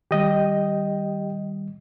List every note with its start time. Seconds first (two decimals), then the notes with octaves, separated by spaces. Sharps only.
0.11 D#3 G3 G4 D#5 G5